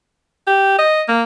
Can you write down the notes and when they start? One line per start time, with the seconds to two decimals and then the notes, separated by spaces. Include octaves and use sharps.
0.47 G4
0.79 D#5
1.09 A#3